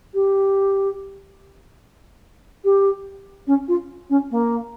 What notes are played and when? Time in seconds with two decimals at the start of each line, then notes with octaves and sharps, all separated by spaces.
0.14 G4
2.64 G4
3.46 C#4
3.68 F4
4.09 C#4
4.30 A#3